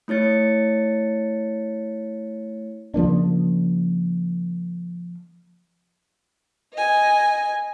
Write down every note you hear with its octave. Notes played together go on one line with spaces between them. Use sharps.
A3 E4 C#5 A6 C#7
C#3 F3 A#3 D4
D#5 G#5